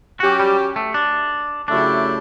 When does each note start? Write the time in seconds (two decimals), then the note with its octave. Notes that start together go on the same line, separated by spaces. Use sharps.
0.20 F#3 C#4 F#4 G4
0.40 G3
0.76 A3
0.94 D4
1.68 C#3 F#3 A3 D4 E4 G4